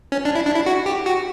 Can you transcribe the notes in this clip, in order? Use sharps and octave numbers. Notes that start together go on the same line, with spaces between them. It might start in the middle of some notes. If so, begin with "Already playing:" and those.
C#4
D4
E4
D4
E4
F#4
G4
F#4